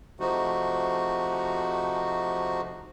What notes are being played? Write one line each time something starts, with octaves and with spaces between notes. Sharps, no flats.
C3 F3 A3 D#4 F#4